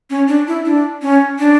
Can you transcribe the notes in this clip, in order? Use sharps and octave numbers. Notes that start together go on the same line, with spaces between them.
C#4
D4
E4
D4
C#4
D4